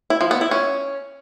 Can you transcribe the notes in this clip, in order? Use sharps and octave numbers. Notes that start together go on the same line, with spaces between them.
E4
F3
B3
E4
C#4